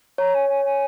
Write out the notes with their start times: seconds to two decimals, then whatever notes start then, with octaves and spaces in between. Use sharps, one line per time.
0.18 C#5 A#5
0.34 G#5
0.49 G#5
0.65 G#5